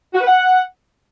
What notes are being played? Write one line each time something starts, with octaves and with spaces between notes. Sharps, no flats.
F#4
B4
F#5